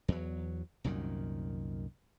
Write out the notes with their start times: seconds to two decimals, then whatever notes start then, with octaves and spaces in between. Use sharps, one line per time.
0.08 E2 F#3
0.84 C2 F#2 A#2 D#3